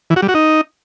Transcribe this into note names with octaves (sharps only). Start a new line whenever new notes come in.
E3
F#4
G3
F#4
D#4